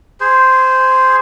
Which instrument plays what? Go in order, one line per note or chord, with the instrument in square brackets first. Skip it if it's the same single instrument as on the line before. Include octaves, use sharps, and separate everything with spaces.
[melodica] G#4 C5